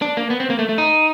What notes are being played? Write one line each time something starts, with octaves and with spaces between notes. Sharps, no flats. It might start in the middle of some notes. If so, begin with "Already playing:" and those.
D4
A#3
B3
C4
A#3
A3
A3
D#4